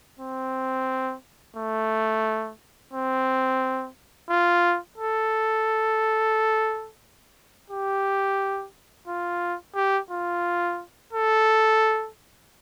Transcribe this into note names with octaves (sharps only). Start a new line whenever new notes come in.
C4
A3
C4
F4
A4
G4
F4
G4
F4
A4